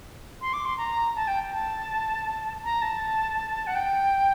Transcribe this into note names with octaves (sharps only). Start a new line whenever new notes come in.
C6
D6
C6
A#5
A5
G5
A5
A#5
A5
F#5
G5